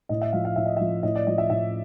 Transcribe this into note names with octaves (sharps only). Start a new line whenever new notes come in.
A2 D#5
E5
F3 F5
F5
A2 E5
D#5
F3 E5
A2 D#5
D5
F3 D#5
E5
A2 E5